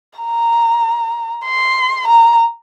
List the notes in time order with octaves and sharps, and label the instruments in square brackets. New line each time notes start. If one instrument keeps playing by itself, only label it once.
[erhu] A#5
C6
A#5